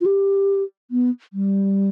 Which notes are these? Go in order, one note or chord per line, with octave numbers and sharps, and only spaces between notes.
F4
G4
B3
G3